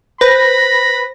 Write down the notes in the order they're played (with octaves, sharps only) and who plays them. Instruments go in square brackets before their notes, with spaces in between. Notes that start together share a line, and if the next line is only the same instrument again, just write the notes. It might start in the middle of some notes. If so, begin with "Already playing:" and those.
[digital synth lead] B4 [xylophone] C5 [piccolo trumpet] B5 [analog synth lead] A#6